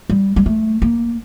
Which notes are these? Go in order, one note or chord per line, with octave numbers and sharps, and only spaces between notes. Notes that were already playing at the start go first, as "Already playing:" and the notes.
G3
G3
A3
A#3